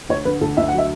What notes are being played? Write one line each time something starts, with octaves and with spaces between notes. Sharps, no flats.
D2 C#5
D3 B4
D2 A4
D2 E5
F#5
F#3
E5